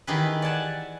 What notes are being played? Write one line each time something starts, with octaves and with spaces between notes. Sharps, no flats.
D#3 E3 G4 G#4 B4
D5 F#5 G#5 A5